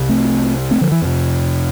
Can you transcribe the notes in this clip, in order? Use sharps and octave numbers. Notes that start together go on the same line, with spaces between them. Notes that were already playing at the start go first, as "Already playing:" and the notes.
Already playing: C2 C3
A3 C4
A3 C4
D3 F3
E3
F2 C3